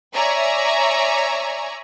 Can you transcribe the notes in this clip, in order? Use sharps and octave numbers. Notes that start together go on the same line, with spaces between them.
C#5 D5 E5 G#5 A#5